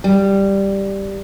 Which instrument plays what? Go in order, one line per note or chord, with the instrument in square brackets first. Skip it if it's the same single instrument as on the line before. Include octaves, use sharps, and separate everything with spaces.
[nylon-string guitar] G3